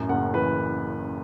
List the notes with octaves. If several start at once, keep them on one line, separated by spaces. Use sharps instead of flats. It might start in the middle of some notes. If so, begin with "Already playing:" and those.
Already playing: A1 F#2
F#1 F#5
E3 B4